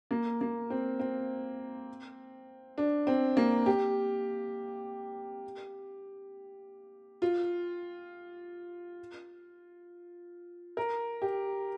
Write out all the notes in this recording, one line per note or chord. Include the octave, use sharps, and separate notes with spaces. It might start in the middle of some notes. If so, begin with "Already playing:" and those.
A#3
A#3
C4
C4
D4
C4
A#3
G4
F4
A#4
G4